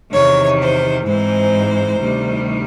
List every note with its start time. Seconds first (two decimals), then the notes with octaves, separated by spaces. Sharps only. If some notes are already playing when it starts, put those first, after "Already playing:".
0.14 E2 C3 D#3 C#5
0.61 C5
1.07 G#2 E3 G#3 C4 D#4 C5
2.01 D2 C3 D#3 G3